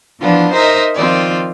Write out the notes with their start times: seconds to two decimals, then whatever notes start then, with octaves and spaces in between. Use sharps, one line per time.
0.21 E3 F3 B3 D4 F4
0.53 D#4 A#4 C5 D#5 E5
0.95 D#3 F3 C4 F4 D5